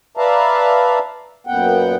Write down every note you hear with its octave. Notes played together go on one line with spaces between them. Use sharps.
B4 D5 E5 F5 A5 A#5
F#2 A#2 B3 F#5 G5